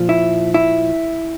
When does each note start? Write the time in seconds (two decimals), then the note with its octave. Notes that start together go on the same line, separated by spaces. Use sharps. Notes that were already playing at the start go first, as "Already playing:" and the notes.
Already playing: A#2 F3
0.09 E4
0.54 E4